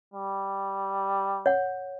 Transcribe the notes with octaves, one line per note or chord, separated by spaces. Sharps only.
G3
C#5 F#5